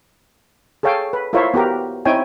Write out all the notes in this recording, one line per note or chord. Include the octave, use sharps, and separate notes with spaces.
G#4 A4 C#5 F5 G5
B4
E4 F4 A#4 C5 C#5 E5
B3 F#4 G4 A#4
C4 D#4 E4 C#5 G5 G#5